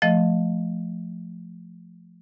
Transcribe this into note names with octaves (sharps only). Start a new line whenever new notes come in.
F3 A3 D#5